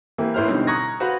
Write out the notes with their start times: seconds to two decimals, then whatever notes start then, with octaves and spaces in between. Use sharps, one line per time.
0.18 E3 A#3 C4 G4
0.34 A1 A2 E3 C5 C6 F6
0.48 B2 D3 G3 C4 D#4
0.67 A#5 C#6 D#6 F#6 G#6 A#6
1.00 F#4 B4 C5 F5 F#5